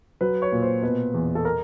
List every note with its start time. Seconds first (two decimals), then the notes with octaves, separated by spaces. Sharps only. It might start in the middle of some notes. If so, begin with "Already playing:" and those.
0.21 F#3 B4
0.42 C#5
0.52 A#2
0.62 C5
0.82 B2 B4
1.14 E2
1.35 A4
1.45 A#4